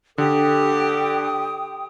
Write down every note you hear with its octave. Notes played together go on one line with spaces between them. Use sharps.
D3 G4 A4 G5 D#6